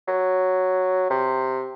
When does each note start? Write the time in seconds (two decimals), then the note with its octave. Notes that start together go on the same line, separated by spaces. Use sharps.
0.08 F#3
1.10 C3